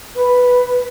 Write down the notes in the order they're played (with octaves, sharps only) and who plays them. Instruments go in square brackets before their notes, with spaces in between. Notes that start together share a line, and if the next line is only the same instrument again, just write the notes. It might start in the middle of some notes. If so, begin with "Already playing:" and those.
[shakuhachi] B4